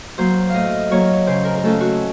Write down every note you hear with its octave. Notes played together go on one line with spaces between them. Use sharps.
F#3 A#3 C5
A2 D#5 F5
F#3 A#3 C#5
C#3 C5
A#4
A#4
A3 C#4 F4 A4
F#4